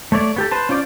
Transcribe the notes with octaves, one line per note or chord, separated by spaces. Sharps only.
A3 C#5 D5
B3 G4 A4
B4 C5 A5
C#4 F4 C5 D5 D6